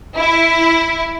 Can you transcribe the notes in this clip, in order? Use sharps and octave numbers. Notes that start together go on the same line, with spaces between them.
E4